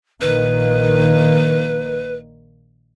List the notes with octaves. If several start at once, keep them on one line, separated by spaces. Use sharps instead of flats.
A#1 D#3 A#3 B4